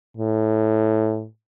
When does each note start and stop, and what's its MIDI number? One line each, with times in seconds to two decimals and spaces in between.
0.17 1.26 45